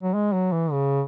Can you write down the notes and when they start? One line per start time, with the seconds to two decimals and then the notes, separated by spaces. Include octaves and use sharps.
0.03 F#3
0.14 G#3
0.33 F#3
0.52 E3
0.72 C#3